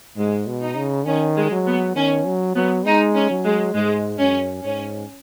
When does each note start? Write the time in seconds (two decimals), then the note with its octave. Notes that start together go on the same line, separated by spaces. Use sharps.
0.17 G#2 G#3
0.47 B2
0.62 D#4
0.77 C#3
1.06 D#3 C#4
1.37 G#3
1.51 F#3
1.67 B3
1.96 D#3 C#4
2.26 F#3
2.56 F#3 B3
2.85 G#3 D#4
3.15 C#4
3.30 F#3
3.45 G#3
3.75 G#2 G#3
4.20 F#2 C#4
4.64 G#2 C#4